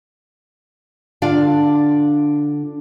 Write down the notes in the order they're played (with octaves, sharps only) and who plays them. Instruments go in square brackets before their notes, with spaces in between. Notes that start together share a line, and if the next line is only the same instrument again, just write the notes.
[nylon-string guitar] D3 D4 F4 F5